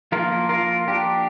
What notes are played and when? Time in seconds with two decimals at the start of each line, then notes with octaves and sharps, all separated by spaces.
0.12 F3 A#3 F4 A#4
0.49 F4 A#4
0.88 D4 G4